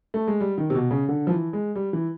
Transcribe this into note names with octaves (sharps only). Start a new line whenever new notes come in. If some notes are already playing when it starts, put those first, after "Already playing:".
A3
G#3
G3
D#3
C3
B2
C#3
D3
F3
E3
G#3
G3
E3